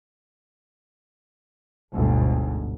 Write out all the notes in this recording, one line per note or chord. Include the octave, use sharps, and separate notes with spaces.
G1 D2 G#2 B2